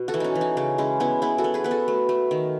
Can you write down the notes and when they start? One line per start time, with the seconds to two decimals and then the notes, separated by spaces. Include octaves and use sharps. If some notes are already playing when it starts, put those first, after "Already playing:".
Already playing: B2
0.08 F#4 A4
0.14 E3
0.20 C#4 D#4
0.35 E3
0.41 D#4
0.57 C#3 C#4
0.78 G#3 C#4 E4
1.00 B3 C#4 E4
1.22 B3 E4 G#4
1.38 F#4 A4
1.44 B3
1.54 G#4 B4
1.64 B3 B4
1.71 F#4 A4
1.88 A3
2.09 A3
2.31 D#3